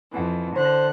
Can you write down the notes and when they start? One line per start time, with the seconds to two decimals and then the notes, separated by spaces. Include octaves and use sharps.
0.12 F2 E3
0.56 D3 C5 F#6